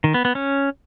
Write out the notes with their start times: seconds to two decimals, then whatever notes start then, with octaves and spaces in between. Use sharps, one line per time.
0.04 D#3
0.14 B3
0.25 B3
0.35 C#4